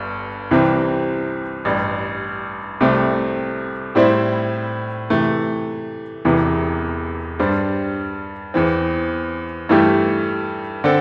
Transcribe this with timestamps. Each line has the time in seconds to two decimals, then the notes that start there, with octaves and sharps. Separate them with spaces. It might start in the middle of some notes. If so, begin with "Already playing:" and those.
Already playing: G1 G2
0.51 C2 C3 E3 C4 G4
1.65 A1 G2 G3
2.81 C2 C3 A3 C4
3.95 A2 G3 C4 E4 C5
5.10 C3 E3 A3
6.25 E1 E2 C3 E3
7.39 G2 G3 D4 C5
8.54 E2 E3 C4
9.69 G2 E3 A3 E4 G4
10.84 D3 C4 A4